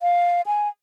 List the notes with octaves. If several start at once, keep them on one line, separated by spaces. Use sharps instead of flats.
F5
G#5